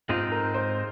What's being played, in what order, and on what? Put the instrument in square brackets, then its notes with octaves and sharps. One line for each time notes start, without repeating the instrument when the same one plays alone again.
[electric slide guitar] G#2 G#3 C4 D#4 [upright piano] F4
[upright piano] A#4
C5